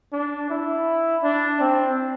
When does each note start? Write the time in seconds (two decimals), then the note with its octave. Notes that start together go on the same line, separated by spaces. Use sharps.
0.13 D4
0.50 E4
1.23 D4
1.60 C4